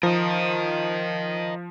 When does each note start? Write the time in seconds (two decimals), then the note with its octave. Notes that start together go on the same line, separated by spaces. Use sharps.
0.03 F3 A#4 D#5